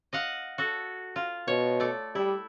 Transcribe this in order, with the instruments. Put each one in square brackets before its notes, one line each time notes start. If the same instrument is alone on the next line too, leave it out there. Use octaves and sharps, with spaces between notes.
[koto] D#5 F5 F#5
F#4 A4
F4
[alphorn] B2 [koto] C#5
[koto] A3 D5
[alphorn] G3 [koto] E4